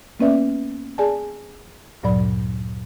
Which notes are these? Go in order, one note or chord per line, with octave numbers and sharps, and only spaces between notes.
A#3 B3 C#4 B4 D5 E5
G#4 D5 G#5 A5
D2 G2 A#2 F#3 D5 B5